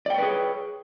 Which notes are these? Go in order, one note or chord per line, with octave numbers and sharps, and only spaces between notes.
G#4 B4 C#5 D5 G5